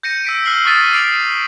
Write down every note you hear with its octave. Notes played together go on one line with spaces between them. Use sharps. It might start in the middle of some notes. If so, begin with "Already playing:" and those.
G6 A#6 C#7 D#7
E6 B6 D7
E6 F6 C7 F#7 G7
C#6 D#6 F6 A6 B6 D#7
D6 E6 C7 D7 F7 F#7